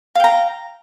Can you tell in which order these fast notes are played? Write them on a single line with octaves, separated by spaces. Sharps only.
F5 G5 A#5